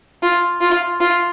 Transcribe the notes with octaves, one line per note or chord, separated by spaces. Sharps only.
F4
F4
F4